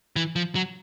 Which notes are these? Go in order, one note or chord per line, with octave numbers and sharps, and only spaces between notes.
E3
F3
F#3